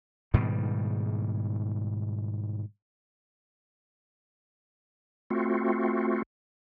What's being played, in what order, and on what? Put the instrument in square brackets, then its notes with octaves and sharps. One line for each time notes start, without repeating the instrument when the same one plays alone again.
[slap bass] G#2 B2 D#3 G3
[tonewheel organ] A3 C4 F4 F#4